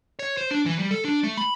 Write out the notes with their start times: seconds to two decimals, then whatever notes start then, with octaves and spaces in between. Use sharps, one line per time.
0.19 C#5
0.37 C5
0.51 D4
0.66 E3
0.79 G3
0.91 A4
1.05 D4
1.24 A3
1.37 B5